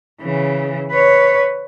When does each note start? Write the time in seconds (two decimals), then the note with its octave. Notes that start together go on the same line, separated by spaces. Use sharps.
0.21 C#3 E3
0.91 B4 C#5